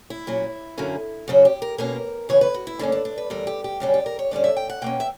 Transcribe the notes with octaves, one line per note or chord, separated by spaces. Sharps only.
E4
A#2 F#3 C#4
F#2 D3 F#3 A#3 C#4
F#2 C#3 F#3 C#4 F#4
G4
A#4
B2 A#3 C#4 A#4
C#3 E3 B3 C#5
B4
F#4
E4
G2 D3 A#3 C#4 D4
D4
D4
B4
E2 D3 G3 A#4
G4
G4
F#2 C#3 G3 C#4 G4
G4
A#4
C#5
G2 D3 G3 C#4 D5
E5
G5
F#5
B2 A#3 C#4 G5
E5